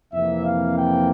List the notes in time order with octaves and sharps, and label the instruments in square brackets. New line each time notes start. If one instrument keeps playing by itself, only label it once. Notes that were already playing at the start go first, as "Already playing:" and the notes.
[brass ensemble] F2 C3 E3 A#3 E5
F5
G5